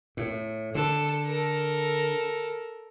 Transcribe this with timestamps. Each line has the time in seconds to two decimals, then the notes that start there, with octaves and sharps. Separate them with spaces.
0.17 A2
0.75 D3 A4
1.25 A4 A#4